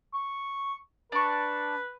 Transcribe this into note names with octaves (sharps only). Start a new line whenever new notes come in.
C#6
D4 B4 C#6